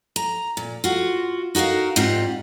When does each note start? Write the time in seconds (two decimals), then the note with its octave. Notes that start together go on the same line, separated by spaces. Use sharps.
0.16 A#5
0.57 A#2
0.84 F4 F#4
1.55 D#4 F#4 A4 A#4 F5
1.96 G#2 G3 C4 F4 F#5